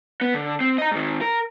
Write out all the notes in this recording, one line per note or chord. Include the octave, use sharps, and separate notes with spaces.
B3
D3
C4
D#5 A#5
G#2 D#3
A#4